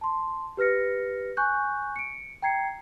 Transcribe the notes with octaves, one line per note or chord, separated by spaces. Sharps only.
A5 C6
G4 B4 F6 A#6 C#7
G#5 C#6 F#6 G6
C#7 D7
G5 A#5 G#6 C7 C#7